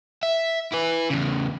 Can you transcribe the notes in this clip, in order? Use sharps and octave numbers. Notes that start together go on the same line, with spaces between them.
E5
E4 B4
E2 C#3